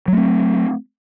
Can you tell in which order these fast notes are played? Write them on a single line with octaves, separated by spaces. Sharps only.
F#3 A3 C4